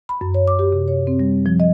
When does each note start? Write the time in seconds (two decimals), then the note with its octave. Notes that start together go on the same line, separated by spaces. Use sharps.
0.09 B5
0.21 F#2
0.34 C#5
0.48 D6
0.59 G4
0.72 C3
0.88 C#5
1.07 C4
1.19 G3
1.46 F3
1.60 D#5